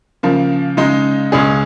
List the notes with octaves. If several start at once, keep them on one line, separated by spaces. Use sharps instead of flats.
C#3 F3 A#3
C#3 G#3 D#4
C#2 C#3 G#3 C#4 G#4